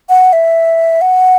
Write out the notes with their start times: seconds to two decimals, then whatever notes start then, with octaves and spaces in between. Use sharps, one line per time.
0.09 F#5
0.33 E5
1.01 F#5